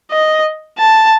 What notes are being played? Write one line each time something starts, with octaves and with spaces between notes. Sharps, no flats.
D#5
A5